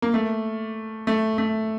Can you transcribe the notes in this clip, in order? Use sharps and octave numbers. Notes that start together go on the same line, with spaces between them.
A#3
A3
A3
A3